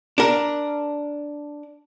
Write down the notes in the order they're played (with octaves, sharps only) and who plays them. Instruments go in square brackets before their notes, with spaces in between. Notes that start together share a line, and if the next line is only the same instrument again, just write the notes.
[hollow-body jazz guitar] D4 A#4